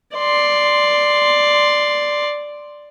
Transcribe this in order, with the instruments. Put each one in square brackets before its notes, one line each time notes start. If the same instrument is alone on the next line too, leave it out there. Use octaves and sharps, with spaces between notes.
[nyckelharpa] D5 C6